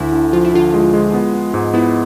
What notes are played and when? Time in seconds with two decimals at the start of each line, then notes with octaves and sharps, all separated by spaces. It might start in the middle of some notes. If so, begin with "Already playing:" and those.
Already playing: D2 E4
0.13 D3
0.33 F3 F4
0.45 E4
0.53 D3 F4
0.74 G#3
0.93 G#3
1.14 B3
1.34 B3
1.54 G#2
1.74 B3 E4